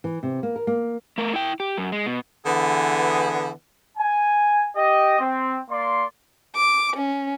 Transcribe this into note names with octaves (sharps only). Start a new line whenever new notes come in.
E3
C3
A#3
A#4
A#3
A3 A#4
E4 G5
G4
F#2
G#3
B2
D3 E3 B3 G#4
G#5
G4 D#5
C4
A#3 D5 C6
D6
C#4